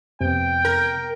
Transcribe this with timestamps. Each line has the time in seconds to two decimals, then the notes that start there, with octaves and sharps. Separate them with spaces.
0.21 F2 C3 B3 G5
0.65 A#4